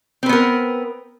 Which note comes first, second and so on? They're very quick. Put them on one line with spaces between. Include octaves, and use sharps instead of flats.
C4 B4 B3 A#4